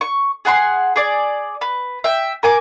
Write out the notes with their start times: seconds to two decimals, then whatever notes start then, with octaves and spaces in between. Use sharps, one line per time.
0.01 C#6
0.45 G#4 F#5 A#5 C6
0.96 G#4 D5
1.61 B4
2.04 E5 G5
2.43 A#4 G#5 D6